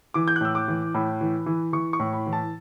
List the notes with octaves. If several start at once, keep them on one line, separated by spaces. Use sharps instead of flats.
E3 D6
G6
F#6
A2 E6
D6
E3
A2 B5
E3
E3
E3 C#6
C#6
A2
B5
E3
A5